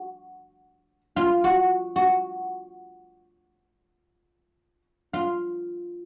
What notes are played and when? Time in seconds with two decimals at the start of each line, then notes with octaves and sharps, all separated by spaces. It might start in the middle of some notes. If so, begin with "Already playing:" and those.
Already playing: F#4
1.16 F4
1.44 F#4
1.96 F#4
5.14 F4